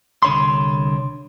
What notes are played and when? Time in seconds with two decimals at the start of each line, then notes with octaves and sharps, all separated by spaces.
0.23 C2 D3 C#5 B5 C6